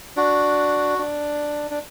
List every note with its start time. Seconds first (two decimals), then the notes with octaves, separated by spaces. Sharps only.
0.17 D4 F#4
0.98 D4
1.71 D4